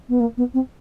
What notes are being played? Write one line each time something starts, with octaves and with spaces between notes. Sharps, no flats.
B3
A#3
B3
C4